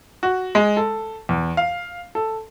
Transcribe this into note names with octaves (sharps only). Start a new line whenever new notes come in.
F#4
G#3
A4
E2
F5
A4